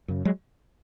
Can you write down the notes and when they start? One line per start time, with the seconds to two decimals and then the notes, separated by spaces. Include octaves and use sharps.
0.08 F#2 C#3
0.25 F#3 G#3